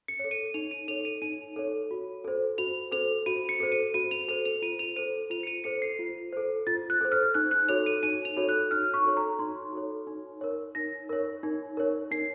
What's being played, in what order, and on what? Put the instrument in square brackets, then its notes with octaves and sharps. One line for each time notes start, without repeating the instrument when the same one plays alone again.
[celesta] C#7
A4 C#5
D#7
D#4 F7
D#7
A4 C#5 F7
D#7
D#4 D#7
A4 C#5
F#4
A4 C5
F#4 F7
A4 C5 F7
F#4 D#7
C#7
A4 C5
D#7
F#4 D#7
F7
A4 C5 F7
F7
F4 D#7
F7
A4 C5 D#7
F4 F7
C#7
D#7
A4 C5 C#7
C7
F4
A4 C5
F4 A6
F#6
A4 C5
F6
D#4 F#6
F#6
F#4 A4 C#5 F7
D#7
D#4 D#7
F7
F#4 A4 C#5
F#6
D#4 F6
C#6
F#4 A4 C#5
A#5
D#4 C6
F#4 A4 C#5
D#4
A#4 C#5
D#4 A#6
A#4 C#5
D#4
A#4 C#5
D#4 C7